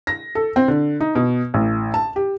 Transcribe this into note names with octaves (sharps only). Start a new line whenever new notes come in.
A#6
A4
C4
D3
D#4
B2
A1
A5
G4